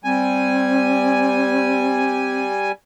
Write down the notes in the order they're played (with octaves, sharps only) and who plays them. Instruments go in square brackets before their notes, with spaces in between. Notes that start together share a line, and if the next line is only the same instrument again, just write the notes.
[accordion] G3 G#5 [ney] C4